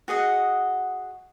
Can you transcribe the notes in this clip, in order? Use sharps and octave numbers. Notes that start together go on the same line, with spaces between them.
F#4 G#4 D#5 F#5